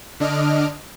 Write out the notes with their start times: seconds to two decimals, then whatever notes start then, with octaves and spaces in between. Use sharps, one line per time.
0.20 D3 D4 D#5 F6 D7